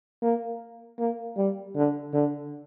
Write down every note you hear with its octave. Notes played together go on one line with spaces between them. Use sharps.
A#3
A#3
G3
D3
D3